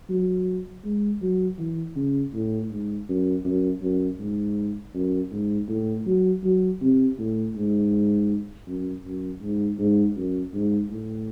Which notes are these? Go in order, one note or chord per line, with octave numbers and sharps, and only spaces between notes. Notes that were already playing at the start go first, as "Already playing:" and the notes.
F#3
G#3
F#3
E3
C#3
A2
G#2
F#2
F#2
F#2
G#2
F#2
G#2
A2
F#3
F#3
C3
A2
G#2
F#2
F#2
G#2
G#2
F#2
G#2
A2